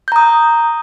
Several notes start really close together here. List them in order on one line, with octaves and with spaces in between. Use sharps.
G6 A#5 D#6